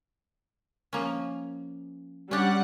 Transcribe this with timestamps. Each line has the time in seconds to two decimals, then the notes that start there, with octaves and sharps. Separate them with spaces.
0.93 F3 A#3 C#4
2.31 G3 C#4 D4 G4 F#5